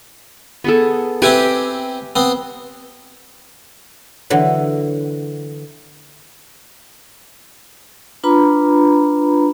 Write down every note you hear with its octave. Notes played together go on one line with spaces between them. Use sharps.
B3 G#4 A4
C4 E4 G4 B4 G#5
B3 C4
D3 E3 F#3
D4 F4 B4 A#5 B5